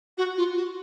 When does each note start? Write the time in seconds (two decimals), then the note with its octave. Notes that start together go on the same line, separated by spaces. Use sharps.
0.18 F#4
0.37 F4
0.57 F#4